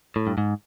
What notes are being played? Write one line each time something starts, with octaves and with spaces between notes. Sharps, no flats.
A2
G2
G#2